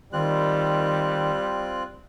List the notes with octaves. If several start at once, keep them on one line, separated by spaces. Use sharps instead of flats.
D#3 G3 C4 F4 F#6